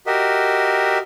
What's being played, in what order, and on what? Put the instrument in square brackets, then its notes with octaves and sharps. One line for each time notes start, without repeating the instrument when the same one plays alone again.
[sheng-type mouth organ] F#4 G4 A#4 D#5 E5